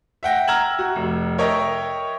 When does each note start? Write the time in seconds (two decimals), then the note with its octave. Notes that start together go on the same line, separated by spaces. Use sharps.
0.23 E5 F#5 G5 A#6
0.48 A#5 E6 F6 G#6 E7 F#7
0.79 F#4
0.96 F1
1.38 A#4 C#5 D#5 E5 G5